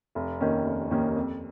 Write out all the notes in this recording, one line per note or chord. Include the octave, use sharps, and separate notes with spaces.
F1
D#2 D#3 A#3 C#4
F1
D#2 D#3 A#3 C#4
F2